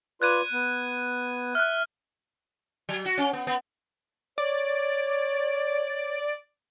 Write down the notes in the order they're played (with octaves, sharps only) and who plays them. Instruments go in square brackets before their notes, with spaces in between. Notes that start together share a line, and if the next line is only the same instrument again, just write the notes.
[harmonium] F4 B4 D5 [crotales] F#6 G#6 D#7
[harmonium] B3
[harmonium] E5 [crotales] F6 F#6
[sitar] F#3
F#4
C#4
B3
B3
[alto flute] C#5 [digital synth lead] D5